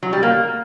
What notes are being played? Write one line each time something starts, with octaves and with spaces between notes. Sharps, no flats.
F#3
G3
A#3